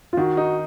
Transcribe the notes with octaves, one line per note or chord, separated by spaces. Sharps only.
F4
D#3 F#4
D#4